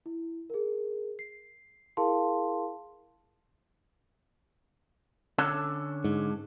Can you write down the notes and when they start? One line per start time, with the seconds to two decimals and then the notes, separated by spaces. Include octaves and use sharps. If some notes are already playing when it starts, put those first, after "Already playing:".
0.06 E4
0.50 G#4 A#4
1.19 C7
1.97 E4 G#4 A#4 F5 A5 C6
5.38 D3 C#4 A4
6.04 G#2